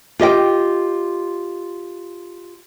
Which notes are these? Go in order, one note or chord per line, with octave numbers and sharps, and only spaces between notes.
F4 G4 D#5 G5